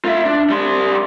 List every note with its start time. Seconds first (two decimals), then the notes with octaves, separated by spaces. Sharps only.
0.05 F4 E5
0.25 D4
0.50 G3 C6